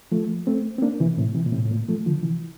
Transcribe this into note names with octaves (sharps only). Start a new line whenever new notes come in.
F3 A3
A3 C4
C4
A#3 D4
C3 E3
A2 C3
C3 E3
A#2
A2 C3
A2
A#2
F3 A3
D3 F3
C3 E3